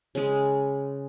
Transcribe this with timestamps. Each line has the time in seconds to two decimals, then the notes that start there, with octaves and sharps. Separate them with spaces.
0.15 C#3 G#3